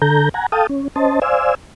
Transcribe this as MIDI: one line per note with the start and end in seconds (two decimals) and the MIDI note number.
0.02 0.29 50
0.02 0.29 69
0.02 0.29 82
0.02 0.29 91
0.34 0.46 78
0.34 0.46 80
0.34 0.46 82
0.52 0.67 69
0.52 0.67 77
0.52 0.67 79
0.52 0.67 81
0.52 0.67 87
0.69 0.88 61
0.96 1.20 61
0.96 1.20 72
0.96 1.20 75
0.96 1.20 81
1.22 1.55 72
1.22 1.55 74
1.22 1.55 77
1.22 1.55 80
1.22 1.55 88